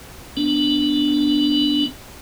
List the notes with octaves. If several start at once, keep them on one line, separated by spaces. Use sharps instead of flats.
B3 D4